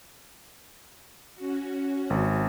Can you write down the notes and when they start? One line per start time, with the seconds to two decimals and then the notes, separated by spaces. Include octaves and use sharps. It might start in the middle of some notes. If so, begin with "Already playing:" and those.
1.35 C#4 F#4
2.10 G#1